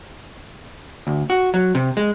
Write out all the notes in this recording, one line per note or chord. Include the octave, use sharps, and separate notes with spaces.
D2
F#4
F#3
C3
G#3